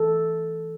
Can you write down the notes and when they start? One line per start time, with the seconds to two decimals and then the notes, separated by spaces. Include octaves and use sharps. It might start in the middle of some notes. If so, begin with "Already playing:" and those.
Already playing: E3 A4